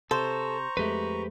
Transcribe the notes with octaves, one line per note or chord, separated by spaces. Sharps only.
C3 A4 C5 A#5 C#6
F2 G#3 A3 G4 B4